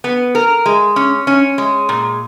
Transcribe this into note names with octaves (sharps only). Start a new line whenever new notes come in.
B3
A#4
G#3
C#4
C#4
G#3
A#2